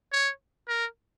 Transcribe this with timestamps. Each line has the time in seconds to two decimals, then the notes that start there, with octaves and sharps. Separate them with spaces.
0.13 C#5
0.68 A#4